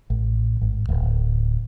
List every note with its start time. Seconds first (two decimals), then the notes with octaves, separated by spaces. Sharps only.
0.10 A1
0.62 G#1
0.89 D1